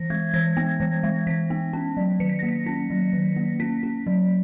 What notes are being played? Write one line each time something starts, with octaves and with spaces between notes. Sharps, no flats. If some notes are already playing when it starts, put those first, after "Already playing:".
Already playing: E3 A#6
G#3 G#6
E3 A#6
B3
E3
G#3
E3 B6
B3
C#4
F#3
D#3 C#7
B6
A#3 A#6
B6
C#4 A#6
F#3
D#3
A#3
C#4 B6
C#4
F#3